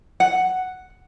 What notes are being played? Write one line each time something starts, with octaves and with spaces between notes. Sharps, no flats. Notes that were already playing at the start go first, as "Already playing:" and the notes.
F#5